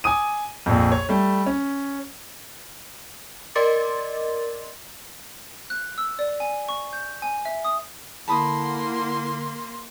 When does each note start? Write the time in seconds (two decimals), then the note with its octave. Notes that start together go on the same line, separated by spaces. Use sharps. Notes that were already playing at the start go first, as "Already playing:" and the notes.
0.04 G#5 D6 D#6 D#7
0.66 A#1 F2
0.92 C#5
1.09 G3 A3
1.46 C#4
3.55 A#4 D5 D#5 C6 D6 A6
5.70 F#6
5.98 E6
6.19 D5
6.40 G#5
6.69 C#6
6.93 G6
7.22 G#5
7.45 E5
7.65 D#6
8.28 D3 A#3 E4 A5 B5 C6 D#6